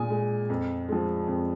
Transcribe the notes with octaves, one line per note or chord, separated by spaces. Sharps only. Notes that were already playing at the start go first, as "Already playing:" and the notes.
Already playing: A#2 G#3 G#5 D#6
G#3
F2
F3 G#3
F2